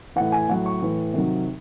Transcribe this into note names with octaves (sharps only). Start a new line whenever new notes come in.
A2 E3 F#5
G#5
A2 F#3 F#5
C#6
A2 E3
C3 D#3 F#3